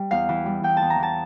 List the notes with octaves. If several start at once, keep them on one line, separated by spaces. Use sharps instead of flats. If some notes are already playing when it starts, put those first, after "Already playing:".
Already playing: G3
E2 F5
E3
G3
E2 G5
E2 A5
A#5
E3 A5